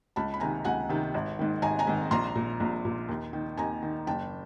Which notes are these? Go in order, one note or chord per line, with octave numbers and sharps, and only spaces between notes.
C#2 A5 B5
B5
C3 D#3 G#5 A#5
C#2 F#5 G#5
C3 D#3
G#1
G#2 D#3
G#1 G#5 A#5
G#5 A#5
G#2 D#3
A#1 A#5 C6
A#2
A#1
A#2
D#2
D#3
D#2 G#5 A#5
D#3
F#1 G5 A5